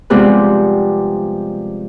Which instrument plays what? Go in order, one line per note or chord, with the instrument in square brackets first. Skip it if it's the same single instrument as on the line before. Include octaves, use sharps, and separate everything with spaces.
[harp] C3 F3 G3 G#3 B3